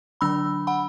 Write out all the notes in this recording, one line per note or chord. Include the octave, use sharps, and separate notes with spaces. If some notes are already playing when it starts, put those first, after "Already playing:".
D3 F#3 D4 B5 E6
F#5 B5